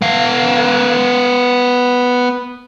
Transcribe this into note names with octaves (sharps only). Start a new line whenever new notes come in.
B3 F5